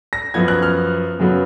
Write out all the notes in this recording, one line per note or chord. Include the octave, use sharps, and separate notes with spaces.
A#6
F#2 F3 B3 G#6
F#6
F6
F#2 C#3 F#3 B3